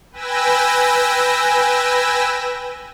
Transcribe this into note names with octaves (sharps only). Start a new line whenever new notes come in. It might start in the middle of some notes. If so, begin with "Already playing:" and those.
B4 G5 G#5 E6 A#6